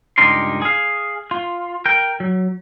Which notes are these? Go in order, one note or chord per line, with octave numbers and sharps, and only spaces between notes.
C#2 G2 D#4 G4 A#4 C6
G#4 F5
F4
A#4 G5
F#3